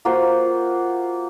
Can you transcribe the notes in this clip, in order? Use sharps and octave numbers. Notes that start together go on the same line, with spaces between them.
A#3 F4 F#4 C5